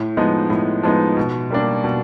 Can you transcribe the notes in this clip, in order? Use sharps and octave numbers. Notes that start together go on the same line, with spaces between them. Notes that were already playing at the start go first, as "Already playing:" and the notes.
Already playing: A2
F3 G#3 B3 D#4
A2
F3 G#3 B3 D#4
B2
G3 A#3 D4
B2